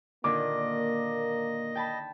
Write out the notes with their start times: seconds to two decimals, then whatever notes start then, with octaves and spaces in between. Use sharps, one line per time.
0.24 A#2 D3 D#3 A#3 D#5 D6
1.75 G5 A5 B5